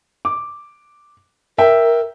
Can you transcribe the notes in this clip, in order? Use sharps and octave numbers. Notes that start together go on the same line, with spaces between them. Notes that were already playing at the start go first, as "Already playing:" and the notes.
D6
A#4 E5 G5